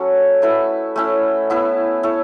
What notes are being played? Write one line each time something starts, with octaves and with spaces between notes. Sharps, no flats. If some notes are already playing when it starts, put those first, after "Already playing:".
Already playing: F#3 C#4 F#4 A4
A3 E4 B4
A3 C#4 E4
B3 E4 B4
E4 A4 C#5